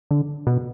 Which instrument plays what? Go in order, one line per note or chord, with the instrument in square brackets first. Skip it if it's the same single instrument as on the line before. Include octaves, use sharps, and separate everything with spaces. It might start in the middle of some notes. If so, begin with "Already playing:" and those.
[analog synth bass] D3
B2